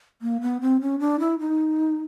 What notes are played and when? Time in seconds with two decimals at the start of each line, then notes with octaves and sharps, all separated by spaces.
0.22 A#3
0.41 B3
0.61 C4
0.81 C#4
1.00 D4
1.20 E4
1.39 D#4